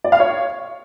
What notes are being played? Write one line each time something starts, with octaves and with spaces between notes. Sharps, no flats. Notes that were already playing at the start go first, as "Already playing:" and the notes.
D5
F5
C#5